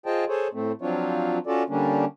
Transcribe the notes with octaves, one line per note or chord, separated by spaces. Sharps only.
F4 G#4 C5 D#5 G5 A5
G#4 A4 C5 C#5
A2 A3 C4
F3 F#3 C4 D4 F4 C#5
C#4 F4 F#4 A4 D5
D3 G3 A#3 C#4 D4